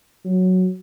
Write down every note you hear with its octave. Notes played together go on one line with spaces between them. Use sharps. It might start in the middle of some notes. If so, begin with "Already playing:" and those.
F#3